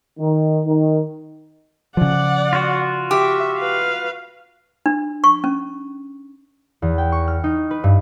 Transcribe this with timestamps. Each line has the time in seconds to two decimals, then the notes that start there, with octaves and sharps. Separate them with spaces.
0.19 D#3
0.66 D#3
1.97 C#3 F3 D5 F#5
2.53 F4 F#4
3.11 G4 E5
3.59 B4 F5
4.86 D4
5.24 C#6
5.44 C#4
6.82 E2
6.98 G5
7.12 C#6
7.28 F6
7.44 D#4
7.71 B4
7.84 G2